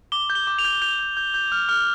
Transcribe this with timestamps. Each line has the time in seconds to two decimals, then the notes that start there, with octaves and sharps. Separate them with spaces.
0.12 D6 G7
0.30 G6
0.35 G7
0.47 D6
0.59 F7
0.65 G6
0.82 G6 F7
0.99 G6
1.17 G6
1.34 G6
1.52 F6
1.69 F6